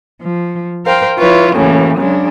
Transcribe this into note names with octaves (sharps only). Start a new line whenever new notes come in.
F3
A#4 C5 F5 G5
F3 E4 F4 B4 C#5
F#2 A2 C#3 E3 A#3
C#3 F#3 G#3 D4